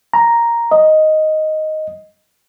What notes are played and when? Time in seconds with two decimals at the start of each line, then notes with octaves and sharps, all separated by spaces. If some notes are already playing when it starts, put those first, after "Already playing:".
0.14 A#5
0.71 D#5